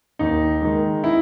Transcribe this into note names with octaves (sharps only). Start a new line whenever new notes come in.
D#2 D#4
D#3 G#3
E4